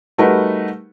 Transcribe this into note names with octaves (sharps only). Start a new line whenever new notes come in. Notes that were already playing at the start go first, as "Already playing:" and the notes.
G3 A3 D#4 F#4 A#4 B4